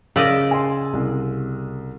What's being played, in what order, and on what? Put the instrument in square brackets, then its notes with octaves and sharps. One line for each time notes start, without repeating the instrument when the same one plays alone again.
[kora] C#3 D5 D#5 [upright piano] A#4 D#6 E6
[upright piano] G#5 C6
C2